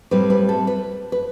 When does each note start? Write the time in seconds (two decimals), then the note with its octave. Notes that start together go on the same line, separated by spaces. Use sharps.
0.11 A2 G3 C4 B4
0.30 B4
0.49 A4
0.67 B4
1.12 B4